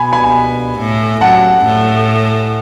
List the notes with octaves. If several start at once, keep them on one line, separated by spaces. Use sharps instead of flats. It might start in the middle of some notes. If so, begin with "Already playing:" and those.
Already playing: B2 G#5 B5
G#5 B5
A2
F#2 F#5 A5
A2